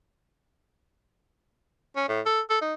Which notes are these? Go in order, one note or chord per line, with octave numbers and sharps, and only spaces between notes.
C#4
A2
A4
A4
D#4